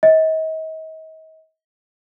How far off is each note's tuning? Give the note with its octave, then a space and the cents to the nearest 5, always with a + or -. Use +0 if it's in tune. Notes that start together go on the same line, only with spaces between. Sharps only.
D#5 +40